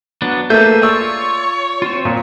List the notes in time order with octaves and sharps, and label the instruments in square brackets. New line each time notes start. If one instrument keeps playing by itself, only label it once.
[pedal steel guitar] F#3 B3 D4
[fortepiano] A3 A#3 A4 [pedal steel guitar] G#4 B4 G6 [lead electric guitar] E5
[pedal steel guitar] F4 D5 [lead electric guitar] C#5 [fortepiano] E6
[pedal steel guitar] C4 F4
[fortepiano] A#2